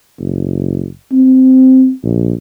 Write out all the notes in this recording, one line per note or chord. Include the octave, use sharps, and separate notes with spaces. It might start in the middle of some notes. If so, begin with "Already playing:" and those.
F#1
C4
A#1